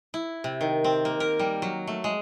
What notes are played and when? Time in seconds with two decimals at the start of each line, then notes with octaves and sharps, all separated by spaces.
0.14 E4
0.44 C3
0.61 D#3
0.84 C4
1.05 A#3
1.20 A#4
1.39 G3
1.62 F#3
1.87 A3
2.04 G#3